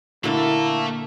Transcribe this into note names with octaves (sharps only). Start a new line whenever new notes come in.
A#2 D3 A3 A#3 E4 A4